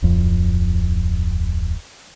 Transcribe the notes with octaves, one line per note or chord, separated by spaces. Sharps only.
D1 F2